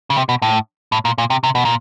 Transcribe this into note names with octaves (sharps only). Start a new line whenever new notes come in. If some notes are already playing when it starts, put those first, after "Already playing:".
C#3
C3
B2
A2
A2
A#2
A#2
C3
C3
B2
A#2